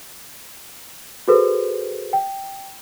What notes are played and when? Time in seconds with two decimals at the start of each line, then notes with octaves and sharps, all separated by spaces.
1.28 F#4 G#4 A4 B4 C5
2.13 G5